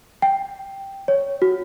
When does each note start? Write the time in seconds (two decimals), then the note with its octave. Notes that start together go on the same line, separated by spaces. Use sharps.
0.22 G5
1.08 C#5
1.42 F#4